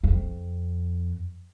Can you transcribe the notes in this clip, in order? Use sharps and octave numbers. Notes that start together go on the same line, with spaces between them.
F2